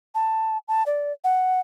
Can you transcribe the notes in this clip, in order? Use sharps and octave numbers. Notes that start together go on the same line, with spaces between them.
A5
A5
D5
F#5